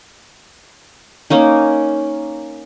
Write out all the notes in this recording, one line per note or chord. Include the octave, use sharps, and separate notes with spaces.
A#3 C#4 D#4